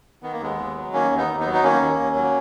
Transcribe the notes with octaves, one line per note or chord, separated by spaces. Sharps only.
D#3 B3
A#3
D#2 G#3 B3
D#2
F#3
D#3 A#3 C#4
D#2
B3 D#4
D#2
B3 D#4
F#3
D#4
D#3 A#3 C#4
D#2
D#2
F#3